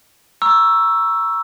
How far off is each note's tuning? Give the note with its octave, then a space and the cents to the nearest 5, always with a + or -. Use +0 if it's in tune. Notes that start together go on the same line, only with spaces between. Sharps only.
A#5 +20 C#6 +0 E6 +5